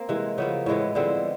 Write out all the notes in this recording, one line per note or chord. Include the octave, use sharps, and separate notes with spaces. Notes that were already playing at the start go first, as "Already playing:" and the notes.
Already playing: A#3 C4
C3 E3 G#3
C#3 F3 A#3 B3
A2 E3 G#3 B3
D3 F3 G#3 B3 C4